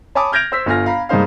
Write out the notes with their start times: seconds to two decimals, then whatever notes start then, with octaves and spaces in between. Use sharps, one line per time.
0.15 C#5 G#5 A5 B5 D6 D#6
0.32 F6 G6 G#6 A#6 D7 F7
0.52 C5 E6 B6
0.66 G1 F4 G#5 F6 A#6
0.86 F5 A#5 B5
1.09 G2 G#3 A#3 D#4 C5 F5